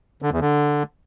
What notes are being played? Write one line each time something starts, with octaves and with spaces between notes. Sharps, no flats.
D3
E2
D3